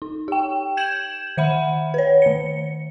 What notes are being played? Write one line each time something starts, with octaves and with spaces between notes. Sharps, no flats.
D#4
G4 G5
G6 G#6 E7 F#7
D#3 E5 F#5 B5
B4 C#5
D#3 C#7